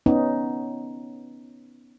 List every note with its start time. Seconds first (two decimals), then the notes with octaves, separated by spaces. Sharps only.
0.06 B3 C#4 D#4